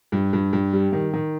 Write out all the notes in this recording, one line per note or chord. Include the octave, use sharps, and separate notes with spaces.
G2
G2
G2
G3
D#3
D#3